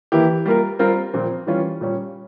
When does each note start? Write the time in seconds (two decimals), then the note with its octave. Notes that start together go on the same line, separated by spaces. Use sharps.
0.12 E3 A#3 E4 G4
0.46 G3 A#3 F4 A#4
0.79 G3 C4 F4 A#4
1.14 A#2 F3 C4
1.47 E3 G3 C#4 F4
1.81 A#2 G3 C#4